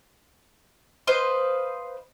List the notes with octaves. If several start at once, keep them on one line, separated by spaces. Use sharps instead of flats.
B4 C5 D#5 F5